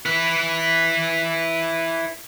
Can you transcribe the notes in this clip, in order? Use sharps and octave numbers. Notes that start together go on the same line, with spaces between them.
E4 B4